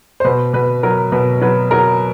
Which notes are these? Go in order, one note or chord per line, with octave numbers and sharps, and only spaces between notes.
C5
B2 B4
B2 B4
F#3 A#4
B2 B4
F#3 B4
F#3 A#4